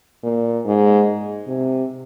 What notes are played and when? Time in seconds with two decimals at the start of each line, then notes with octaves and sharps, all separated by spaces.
0.23 A#2
0.65 G#2
1.48 C3